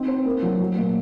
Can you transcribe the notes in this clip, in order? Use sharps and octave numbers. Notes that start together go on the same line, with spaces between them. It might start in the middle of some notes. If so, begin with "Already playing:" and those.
Already playing: C4 D#4
C5
A#3
F#3
F#3
A#2